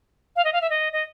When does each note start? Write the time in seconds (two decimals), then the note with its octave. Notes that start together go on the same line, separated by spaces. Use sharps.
0.36 F5
0.45 D#5
0.53 F5
0.61 E5
0.70 D#5
0.93 D#5